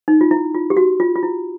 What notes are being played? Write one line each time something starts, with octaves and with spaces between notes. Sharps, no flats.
D#4
F4
E4
F4
G4
F#4
F4
F4
E4